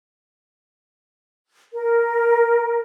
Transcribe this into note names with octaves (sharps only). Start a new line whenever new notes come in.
A#4